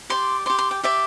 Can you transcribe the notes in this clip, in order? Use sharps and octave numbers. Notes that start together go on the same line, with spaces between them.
G4 D5 C6
G4 D5 C6
C6
G5
G4 D5 E5